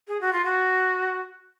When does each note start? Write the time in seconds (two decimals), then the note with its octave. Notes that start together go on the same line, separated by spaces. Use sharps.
0.08 G#4
0.21 F#4
0.33 F4
0.44 F#4